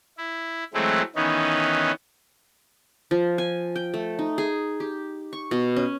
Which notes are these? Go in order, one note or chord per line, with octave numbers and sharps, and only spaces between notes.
E4
E3 F#3 G#3 A3 C4 E4
D#3 E3 B3 C#4 D#4
F3
G#5
G5
A3
D#4
G#4
G4
C#6
B2
C#4